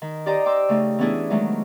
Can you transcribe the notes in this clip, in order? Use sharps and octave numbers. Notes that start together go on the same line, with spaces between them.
D#3
G4 C5 D5 D#5 G5 A#5
G5 C6 D6 E6
C#3 A3 D#4
E3 B3 C#4 D4 E4 G#4
D#3 F#3 G#3 A3 D4